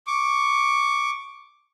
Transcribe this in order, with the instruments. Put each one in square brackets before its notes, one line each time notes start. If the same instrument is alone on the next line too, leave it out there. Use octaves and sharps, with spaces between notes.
[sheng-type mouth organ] C#6 D6